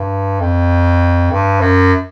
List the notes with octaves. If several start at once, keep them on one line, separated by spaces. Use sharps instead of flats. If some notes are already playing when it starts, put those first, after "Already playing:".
Already playing: G2
F2
G2
F#2